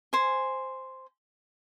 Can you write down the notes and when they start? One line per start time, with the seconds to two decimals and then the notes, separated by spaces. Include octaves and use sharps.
0.13 C5 G#5